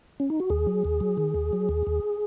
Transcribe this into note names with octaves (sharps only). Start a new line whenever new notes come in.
C#4
D#4
F#4
D#2 G#4
F#3
D#2
F#3
D#3
D#2
F#3
D#2
D#2